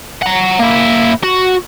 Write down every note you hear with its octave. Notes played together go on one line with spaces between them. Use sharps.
F#5 A#5
A#3 E4
F#4